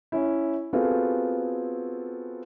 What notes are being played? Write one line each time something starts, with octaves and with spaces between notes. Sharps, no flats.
C#4 E4
B3 C4 F4 F#4 G#4 A4